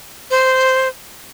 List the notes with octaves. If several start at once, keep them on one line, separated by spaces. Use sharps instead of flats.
C5